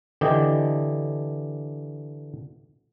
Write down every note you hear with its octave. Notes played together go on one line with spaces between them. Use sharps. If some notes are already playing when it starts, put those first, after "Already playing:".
D3 E3 G4 D#5